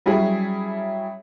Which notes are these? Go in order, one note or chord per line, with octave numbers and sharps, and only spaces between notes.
F#3 G3 C#4 E4 G#4